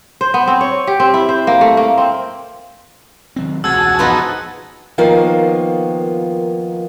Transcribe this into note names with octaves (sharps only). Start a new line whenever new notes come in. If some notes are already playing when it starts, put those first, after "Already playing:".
C5
B3
C4
C#5
G4
C4
E4
C5
A#3
A3
A#3
C4
D#3 F#3 C4
E1 C#2 F#4 G#4 A5 E6 G#6
F3 B3 D#4
D#3 F3 A#3 B3 F4